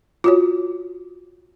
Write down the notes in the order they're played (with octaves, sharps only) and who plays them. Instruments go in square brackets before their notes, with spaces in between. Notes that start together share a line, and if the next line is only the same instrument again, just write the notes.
[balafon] F4 F#4 C#5